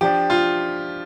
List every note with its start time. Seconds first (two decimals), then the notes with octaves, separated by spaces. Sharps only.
0.01 F3 D4 G4
0.30 F4